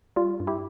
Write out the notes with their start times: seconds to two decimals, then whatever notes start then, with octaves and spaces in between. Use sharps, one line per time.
0.16 G3 F4
0.40 G2
0.47 E4 G4